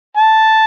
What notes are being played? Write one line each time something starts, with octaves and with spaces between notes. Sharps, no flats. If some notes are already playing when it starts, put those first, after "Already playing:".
A5